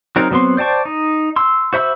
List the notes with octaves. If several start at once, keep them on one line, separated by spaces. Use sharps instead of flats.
F#3 C4 D#4 A#4
C#3 F#3 B3 C4 C6
C5 D5 G5 A5 C#6
D#4
C6 E6
F#4 C5 E5 B5 E6